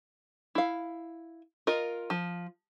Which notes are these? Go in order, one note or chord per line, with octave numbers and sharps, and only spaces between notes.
E4 F5
F4 A#4 D#5
F3